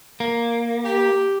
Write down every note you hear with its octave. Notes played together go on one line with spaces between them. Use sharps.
A#3
G4